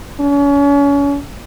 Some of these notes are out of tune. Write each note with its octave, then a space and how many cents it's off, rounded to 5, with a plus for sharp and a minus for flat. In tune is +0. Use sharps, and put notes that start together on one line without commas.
C#4 +35